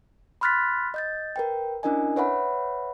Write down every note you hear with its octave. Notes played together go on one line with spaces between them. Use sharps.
B5 C6 F6 F#6 A6 B6
D#5 G6 A6
A#4 B4 G5
C#4 D4 E4 A#4 D#5 G#5
B4 C#5 E5 F#5 B5